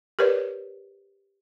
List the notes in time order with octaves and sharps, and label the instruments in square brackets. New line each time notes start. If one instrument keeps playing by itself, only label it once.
[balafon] G4 A#4 B4 C#5 D5